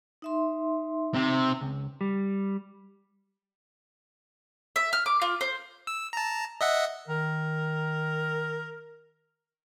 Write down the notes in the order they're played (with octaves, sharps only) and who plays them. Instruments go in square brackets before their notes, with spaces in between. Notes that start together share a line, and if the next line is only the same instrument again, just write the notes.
[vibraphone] D#4 E5 C6
[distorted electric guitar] C3
[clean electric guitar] C#2
G3
[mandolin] E5
F6
D6
F4
C5
[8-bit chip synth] E6
A5 A#5
D#5 E5 F#5
[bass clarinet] D#3 [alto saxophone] A#4